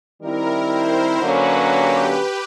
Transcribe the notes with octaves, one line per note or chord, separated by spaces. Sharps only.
D#3 G3 C4 E4 A#4
C5
D3 F#3 A#3 C#4 B4
G4